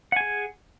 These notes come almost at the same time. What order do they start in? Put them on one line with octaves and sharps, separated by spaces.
F#5 G#5 G#4